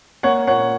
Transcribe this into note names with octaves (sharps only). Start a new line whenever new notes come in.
A#3 C#5 F#5
A#2 C#5 F#5